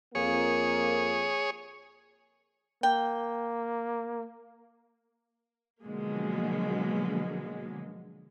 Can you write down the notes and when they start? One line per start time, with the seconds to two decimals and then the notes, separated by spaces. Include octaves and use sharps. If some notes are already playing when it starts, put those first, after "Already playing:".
0.15 F2 A#3 G#4 C#5
2.83 A#3 G5
5.83 B2 D3 F3 F#3 G#3 A#3